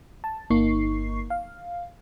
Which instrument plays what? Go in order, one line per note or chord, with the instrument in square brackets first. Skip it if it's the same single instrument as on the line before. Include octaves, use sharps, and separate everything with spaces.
[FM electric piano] A5
G1 A#3 D#4 C#6 C7
F5